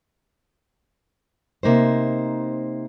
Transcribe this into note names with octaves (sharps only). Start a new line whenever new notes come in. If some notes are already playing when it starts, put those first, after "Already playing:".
C3 A#3 D#4 C5